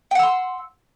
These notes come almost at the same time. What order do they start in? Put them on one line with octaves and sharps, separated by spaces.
G5 F#5 E6 C6